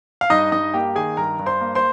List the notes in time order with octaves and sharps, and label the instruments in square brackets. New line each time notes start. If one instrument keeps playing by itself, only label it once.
[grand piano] F5
G2 D#4 D#5
G2 D#4 D#5
A#3 G4 G5
D#3 G#4 G#5
G2 A#4 A#5
G2
C5 C6
A#3
C5 C6